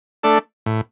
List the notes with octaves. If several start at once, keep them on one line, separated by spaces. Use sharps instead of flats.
A3 D4 A4 D5
A2